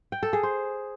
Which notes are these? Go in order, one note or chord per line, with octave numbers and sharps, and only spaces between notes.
G5
A4
G#4
C5